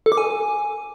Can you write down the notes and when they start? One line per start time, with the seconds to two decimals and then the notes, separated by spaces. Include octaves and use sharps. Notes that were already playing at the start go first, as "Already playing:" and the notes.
0.06 A4
0.12 D6
0.18 G#5